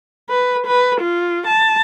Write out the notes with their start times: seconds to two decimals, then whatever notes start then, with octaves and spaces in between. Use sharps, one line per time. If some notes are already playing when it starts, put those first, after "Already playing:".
0.30 B4
0.66 B4
1.01 F4
1.47 A5